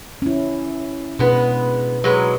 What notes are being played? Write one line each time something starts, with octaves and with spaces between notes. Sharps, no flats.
C#4 E4
B2 G#3 B3 D4 B4
F#3 G#3 B4